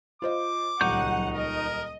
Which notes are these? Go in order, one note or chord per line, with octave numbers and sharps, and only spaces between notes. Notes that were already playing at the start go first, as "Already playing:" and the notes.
F4 C5 D#5 D6
D#1 C#2 F#3 D#4 F#5 C#6 G6
A#4 D#5